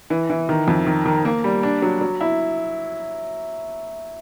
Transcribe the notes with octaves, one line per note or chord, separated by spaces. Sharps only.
E3
E3
D#3
F2
D#3
D#3
A#3
G3
D4
F#3
F#3
E4